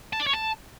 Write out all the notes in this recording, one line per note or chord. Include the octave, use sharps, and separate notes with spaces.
A5
D5
C#5
A5